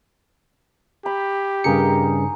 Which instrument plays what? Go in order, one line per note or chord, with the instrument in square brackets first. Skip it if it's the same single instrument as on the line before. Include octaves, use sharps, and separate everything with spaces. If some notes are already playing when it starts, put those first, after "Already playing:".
[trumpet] G4 [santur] B5
[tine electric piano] G2 C#3 C#7 [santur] D#4 G#4 A#4